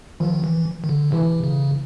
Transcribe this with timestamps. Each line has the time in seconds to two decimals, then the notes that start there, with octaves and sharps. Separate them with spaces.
0.20 D#3 F3
0.44 E3
0.84 D#3
0.89 D3
1.12 C3 E3
1.44 C#3